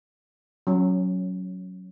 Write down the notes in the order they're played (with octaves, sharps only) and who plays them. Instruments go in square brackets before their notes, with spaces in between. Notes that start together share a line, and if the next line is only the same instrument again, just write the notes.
[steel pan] F#3 C#4